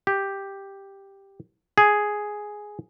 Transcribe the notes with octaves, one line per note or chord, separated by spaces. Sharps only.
G4
G#4